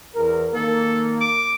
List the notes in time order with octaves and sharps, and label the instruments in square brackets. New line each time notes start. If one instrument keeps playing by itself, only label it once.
[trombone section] E2 A#4
[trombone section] D#3 A#3 [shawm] A4
[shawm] D6